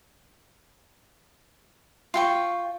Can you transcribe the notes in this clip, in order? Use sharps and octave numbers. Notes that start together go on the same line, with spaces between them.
F4 G5 C#6